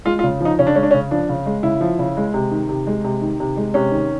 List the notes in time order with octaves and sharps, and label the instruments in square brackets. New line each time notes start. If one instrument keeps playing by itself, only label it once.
[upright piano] G#3 F4
F4
C#3
F3 D#4
C#3 C#4
D4
G#3 C#4
D4
C#4
C#3
F3 D4
C#3
G#3
C#3 E4
F3
C#3
G#3
C3
D#3
C3
G#3
C3
D#3
C3
G#3
C3 C#4
D#3